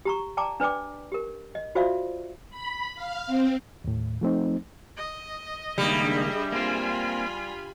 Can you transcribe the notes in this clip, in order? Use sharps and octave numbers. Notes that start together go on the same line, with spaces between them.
G4 A#5 C#6
D5 G5 A5 A#5 D6
D4 B4 D5 G5 D6
G4 A#4
D#5
F4 F#4 C5 D5 E5 F5
B5
F5
C4
D#2 A2
F3 A3 C4 D#4
D#5
C#2 D#3 G3 A#3 D4 G#4 E5
A#3 C4 F4 G#5 B5